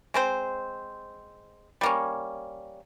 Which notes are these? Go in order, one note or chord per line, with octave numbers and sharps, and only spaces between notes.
G#3 C4 C5
G3 A#3 C#4